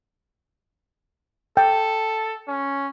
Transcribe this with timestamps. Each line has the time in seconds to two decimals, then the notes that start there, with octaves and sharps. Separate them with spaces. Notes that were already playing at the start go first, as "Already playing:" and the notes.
1.57 A4 G5
2.48 C#4